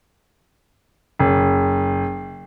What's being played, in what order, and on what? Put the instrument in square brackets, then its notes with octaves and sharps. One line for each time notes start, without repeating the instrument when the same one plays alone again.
[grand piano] F#1